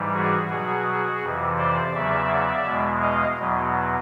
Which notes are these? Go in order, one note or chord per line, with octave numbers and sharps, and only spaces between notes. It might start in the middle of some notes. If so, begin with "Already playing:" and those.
Already playing: G#2 E3 G3
F#4 G#4
B2 F#3 F#4 G#4
F2 C3 E3
C5 D5
E2 C#3 F#3 D5 E5
E2 B2 G#3
D#5 F5
E2 B2 F#3